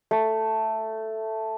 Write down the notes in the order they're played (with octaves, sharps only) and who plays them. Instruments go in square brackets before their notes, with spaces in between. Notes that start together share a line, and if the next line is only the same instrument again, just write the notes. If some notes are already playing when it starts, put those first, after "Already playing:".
[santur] A3